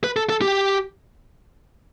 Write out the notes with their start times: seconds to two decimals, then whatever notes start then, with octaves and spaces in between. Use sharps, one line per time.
0.04 B4
0.16 A4
0.30 A4
0.42 G4